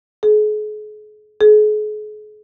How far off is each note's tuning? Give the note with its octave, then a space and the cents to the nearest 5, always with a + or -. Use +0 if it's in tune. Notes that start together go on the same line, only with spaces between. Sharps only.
G#4 +40
G#4 +40